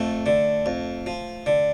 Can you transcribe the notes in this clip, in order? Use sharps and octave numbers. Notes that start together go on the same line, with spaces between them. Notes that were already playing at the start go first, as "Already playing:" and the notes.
Already playing: F2 A3
D3
F2
F3
D3